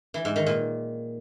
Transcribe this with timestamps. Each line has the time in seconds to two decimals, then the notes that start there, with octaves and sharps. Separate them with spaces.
0.14 E3
0.25 G#2
0.36 D#3
0.46 A#2